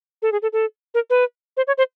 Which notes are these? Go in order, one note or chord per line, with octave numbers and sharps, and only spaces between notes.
A4
G#4
A4
A4
A#4
B4
C5
C#5
C5